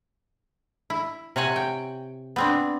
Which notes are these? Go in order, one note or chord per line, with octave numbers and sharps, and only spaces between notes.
E4
C3 C#5 F#5 G#5
G5
B3 C4 D4